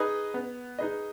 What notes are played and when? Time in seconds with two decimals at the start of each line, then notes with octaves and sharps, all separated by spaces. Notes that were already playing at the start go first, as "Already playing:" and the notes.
Already playing: D#4 G#4 B4 D#5
0.34 B3
0.79 D#4 G#4 B4 D#5